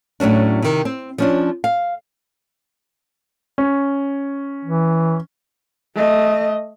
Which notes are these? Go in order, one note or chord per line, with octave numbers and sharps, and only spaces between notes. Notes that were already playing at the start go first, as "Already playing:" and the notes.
A2 F#3 C#4 D4
C3 D#3
C4
F3 C#4 D4
F5
C#4
E3
A3 D#5